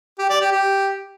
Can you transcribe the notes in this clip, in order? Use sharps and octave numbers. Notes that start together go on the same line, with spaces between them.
G4
D5
G4
G4